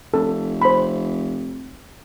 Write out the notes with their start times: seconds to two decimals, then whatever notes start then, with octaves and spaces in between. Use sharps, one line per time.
0.14 F1 A4
0.62 C5 B5